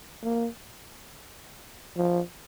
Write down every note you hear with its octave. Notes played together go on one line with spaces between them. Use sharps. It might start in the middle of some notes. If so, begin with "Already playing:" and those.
A#3
F3